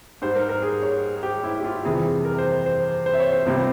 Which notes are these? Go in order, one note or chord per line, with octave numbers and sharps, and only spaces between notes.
G#2 G3 C5
A#4
A#4
G#4
C#5
G#4
G4
E4
G4
F4
F2 C3 E3 G3 G#4
A#4
C5
C5
C5
E5
C#5
C5
C#2 C3 G3